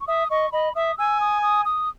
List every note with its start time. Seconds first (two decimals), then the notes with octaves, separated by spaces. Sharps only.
0.01 C#6
0.07 E5 D#6
0.30 D#5 C#6
0.52 D#5 B5
0.75 E5 D#6
0.98 G#5 E6
1.20 D#6
1.42 D#6
1.65 D#6